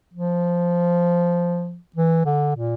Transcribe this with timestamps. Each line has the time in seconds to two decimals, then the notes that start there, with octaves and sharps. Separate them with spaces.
0.14 F3
1.96 E3
2.25 D3
2.56 A#2